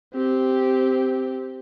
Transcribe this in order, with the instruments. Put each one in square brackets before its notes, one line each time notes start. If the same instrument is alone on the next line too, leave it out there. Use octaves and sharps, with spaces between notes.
[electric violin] C4 G4